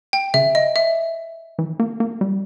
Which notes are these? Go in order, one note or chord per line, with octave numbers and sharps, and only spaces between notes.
G5
C#3 E5
D#5
E5
E3
A#3
A#3
G3